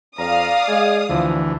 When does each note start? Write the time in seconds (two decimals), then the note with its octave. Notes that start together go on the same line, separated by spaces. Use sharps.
0.18 F2 D5 F5 A#5 D#6
0.68 G#3 G#4
1.09 D2 E3 F3